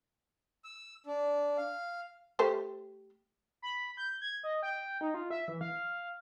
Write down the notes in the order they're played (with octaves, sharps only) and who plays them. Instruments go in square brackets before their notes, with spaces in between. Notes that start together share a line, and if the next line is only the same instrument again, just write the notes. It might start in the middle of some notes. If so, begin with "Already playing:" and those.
[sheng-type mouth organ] E6
D4
F5
[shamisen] A3 G4 C5
[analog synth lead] B5
G6
G#6
D#5
G5
D#4
F4
E5
E3
F5